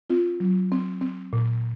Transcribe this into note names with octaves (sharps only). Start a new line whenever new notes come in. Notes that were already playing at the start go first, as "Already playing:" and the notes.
C4 F4
F#3
C4
C4
A#2